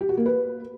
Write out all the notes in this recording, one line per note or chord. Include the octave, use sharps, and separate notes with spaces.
G4
F#4
A#3
B4